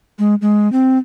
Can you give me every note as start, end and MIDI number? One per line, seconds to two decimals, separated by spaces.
0.19 0.35 56
0.41 0.70 56
0.72 0.98 60